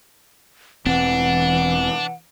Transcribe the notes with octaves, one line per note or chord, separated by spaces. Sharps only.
E1 E3 C4 D4 F#5